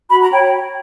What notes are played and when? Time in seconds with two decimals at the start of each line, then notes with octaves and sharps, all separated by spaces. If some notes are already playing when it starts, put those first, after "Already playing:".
0.10 F#4 B5
0.21 A#5
0.32 C#5 G5